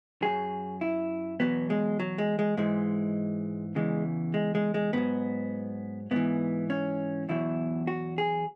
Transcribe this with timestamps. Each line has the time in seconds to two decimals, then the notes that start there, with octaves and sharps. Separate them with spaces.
0.22 F#2 F#3 G#4
0.81 E4
1.40 E2 B2 F#3 B3
1.70 G#3
1.99 F#3
2.18 G#3
2.39 G#3
2.57 G#2 E3 G#3
3.75 E2 C#3 E3 G#3
4.34 G#3
4.55 G#3
4.74 G#3
4.93 G#2 F#3 B3
6.11 G#2 E3 B3
6.70 C#4
7.29 E2 B2 F#3 E4
7.87 F#4
8.18 G#4